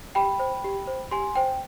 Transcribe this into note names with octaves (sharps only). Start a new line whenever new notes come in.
G4 G5 B5
C5
G4
C5
G4 G#5 C6
C5 G5